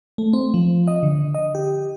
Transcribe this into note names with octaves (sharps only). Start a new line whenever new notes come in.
A3
C4
F3
D#5
D3
D#5
G4